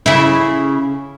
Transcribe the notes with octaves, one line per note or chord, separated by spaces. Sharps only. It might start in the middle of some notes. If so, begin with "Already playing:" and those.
C#3 E4